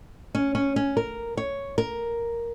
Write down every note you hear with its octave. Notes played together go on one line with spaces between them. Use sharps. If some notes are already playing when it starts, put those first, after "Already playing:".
C#4
C#4
C#4
A#4
C#5
A#4